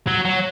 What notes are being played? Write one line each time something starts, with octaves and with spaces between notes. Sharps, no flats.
F#3
F#3